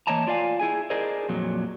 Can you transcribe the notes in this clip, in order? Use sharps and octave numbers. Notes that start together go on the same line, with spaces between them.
E3 A#3 C#5 D#5 A5 A#5
D4 F4 D5 F5 G#5
E4 G#4 G#5
G#4 A#4 C5 D5 D#5
F2 A#2 F#3